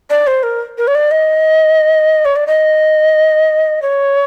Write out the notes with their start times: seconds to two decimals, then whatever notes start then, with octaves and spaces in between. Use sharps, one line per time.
0.10 D5
0.27 C5
0.43 A#4
0.78 A#4
0.87 C#5
0.95 D5
1.11 D#5
2.25 C#5
2.36 D5
2.47 D#5
3.82 C#5